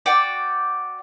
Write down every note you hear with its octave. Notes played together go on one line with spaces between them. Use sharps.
F#4 D5 G5